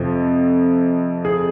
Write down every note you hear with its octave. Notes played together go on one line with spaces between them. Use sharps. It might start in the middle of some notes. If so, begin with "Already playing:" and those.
Already playing: F2 C3 F3
G#4